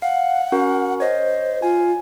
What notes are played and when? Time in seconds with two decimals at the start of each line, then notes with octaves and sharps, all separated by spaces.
0.02 F5 F#5
0.52 C#4 F#4 A#4
1.00 C5 C#5 D#5
1.62 F4 G#5